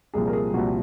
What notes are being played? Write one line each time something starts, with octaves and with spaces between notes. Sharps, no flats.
C2 A#2 F3 G#4
A#4
G#4
C2 A#2 F3 F#4